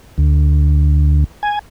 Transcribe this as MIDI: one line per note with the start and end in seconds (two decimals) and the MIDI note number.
0.18 1.24 38
1.43 1.59 80